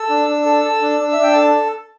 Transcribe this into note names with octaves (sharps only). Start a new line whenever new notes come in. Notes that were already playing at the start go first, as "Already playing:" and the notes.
Already playing: A4 E6
D4
D4
A4
A4
D4
D4
E5
D4 G5
A4 A5